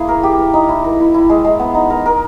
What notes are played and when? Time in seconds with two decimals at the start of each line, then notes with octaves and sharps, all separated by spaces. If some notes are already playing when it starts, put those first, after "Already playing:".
Already playing: A#3 E4 G#4
0.08 A#4
0.23 G4
0.39 A#4
0.54 D#4
0.69 E4
0.84 A#4
1.00 E4
1.14 E4
1.29 G#3
1.44 G#3
1.59 B3
1.75 D#4
1.90 A#4
2.06 A#4